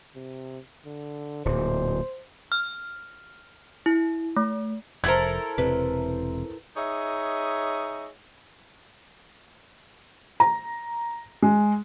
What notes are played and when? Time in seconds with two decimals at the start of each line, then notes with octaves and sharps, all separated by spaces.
0.15 C3
0.86 D3
1.45 D1 A#2 C5
2.52 F6
3.86 E4
4.36 A3
5.04 F1 E4 A4 A#4 C5 G#6
5.58 E1 C3 B4
6.76 D#4 G#4 C#5 D#5 E5
10.40 A#5
11.42 G#3